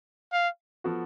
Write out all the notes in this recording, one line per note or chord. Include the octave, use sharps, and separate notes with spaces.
F5
F3 B3 F#4 A4